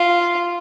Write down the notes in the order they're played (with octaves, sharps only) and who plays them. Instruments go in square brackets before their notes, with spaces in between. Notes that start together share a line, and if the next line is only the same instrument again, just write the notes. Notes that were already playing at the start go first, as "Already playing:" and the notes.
Already playing: [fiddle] F4